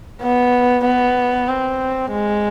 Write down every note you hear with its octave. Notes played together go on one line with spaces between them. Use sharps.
B3
B3
C4
G#3